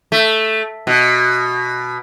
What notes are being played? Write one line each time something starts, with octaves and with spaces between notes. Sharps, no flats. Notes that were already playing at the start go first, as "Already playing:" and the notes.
A3
B2